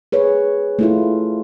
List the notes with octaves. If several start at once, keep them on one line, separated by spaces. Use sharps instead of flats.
G#4 B4 C#5
A3 E4 F4